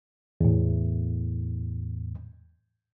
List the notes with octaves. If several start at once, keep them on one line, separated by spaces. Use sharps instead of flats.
E2 A2